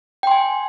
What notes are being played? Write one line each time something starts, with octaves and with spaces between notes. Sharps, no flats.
G5 G#5 C6